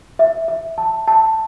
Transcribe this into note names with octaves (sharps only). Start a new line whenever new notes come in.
E5
E5
A5
A5